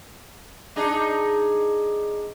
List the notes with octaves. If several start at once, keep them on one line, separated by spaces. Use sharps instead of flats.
D4 D#4 G#4